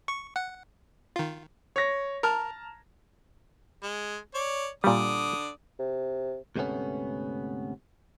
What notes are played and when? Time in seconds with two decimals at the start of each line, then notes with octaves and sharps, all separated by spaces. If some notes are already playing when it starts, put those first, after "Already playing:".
0.08 C#6
0.36 F#5
1.16 D#3 F4
1.76 C#5 A#6
2.23 A#4 A5 A#5 F6
3.83 G#3
4.34 C#5 D5
4.84 A#2 D3 G3 D5 D#6
5.79 C3
6.56 D2 G#2 C3 A3 B3 C#4